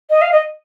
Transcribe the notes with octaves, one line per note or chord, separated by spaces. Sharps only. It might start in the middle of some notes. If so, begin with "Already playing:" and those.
D#5
F5
D#5